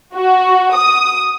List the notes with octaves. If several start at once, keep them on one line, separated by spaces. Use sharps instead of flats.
F#4
D#6